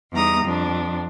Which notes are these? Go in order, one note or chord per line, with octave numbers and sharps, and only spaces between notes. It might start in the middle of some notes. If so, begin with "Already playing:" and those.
E2 G3 D#4 A#5 D#6
F2 D4